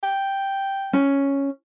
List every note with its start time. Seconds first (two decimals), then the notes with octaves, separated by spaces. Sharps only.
0.03 G5
0.93 C#4